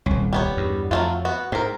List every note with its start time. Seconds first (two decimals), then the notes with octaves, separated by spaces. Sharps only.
0.06 D#1 C2 C#4
0.33 G3 B3 C#5
0.57 E2 G2
0.91 F2 F#3 A3 F4
1.25 B3 F#4
1.52 G#2 C4 A#4